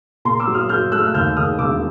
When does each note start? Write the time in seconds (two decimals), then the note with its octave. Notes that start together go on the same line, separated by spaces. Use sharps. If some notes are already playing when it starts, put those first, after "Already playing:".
0.25 A#2 A#5 C6
0.40 D6 E6
0.47 F#3
0.54 D#6 F6
0.69 F#3 F6 G6
0.92 A3 E6 F#6
1.00 F6
1.07 F#6
1.14 D#2 F6 G6
1.37 D#2 D#6 F6
1.58 E1 D6 E6